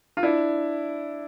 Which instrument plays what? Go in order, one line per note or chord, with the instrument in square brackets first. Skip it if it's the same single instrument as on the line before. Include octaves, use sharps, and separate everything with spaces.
[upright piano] F4
D4 E4